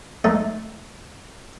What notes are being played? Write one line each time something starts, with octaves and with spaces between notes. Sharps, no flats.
G#3 A3 D#4 A4 C#5